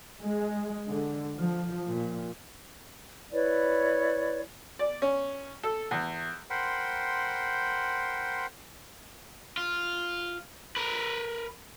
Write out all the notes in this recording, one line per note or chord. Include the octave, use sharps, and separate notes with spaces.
G#3
D3
F3
A#2
E4 B4 C#5 D5
D5
C#4
A4
E2
A#4 C5 F#5 G5 B5 C6
F4
A#4 B4